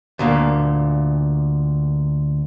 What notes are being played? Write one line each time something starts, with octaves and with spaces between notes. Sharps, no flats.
D2 A#2 A#3